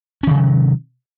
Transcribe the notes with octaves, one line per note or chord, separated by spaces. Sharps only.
C3 D#3 F#3 C#4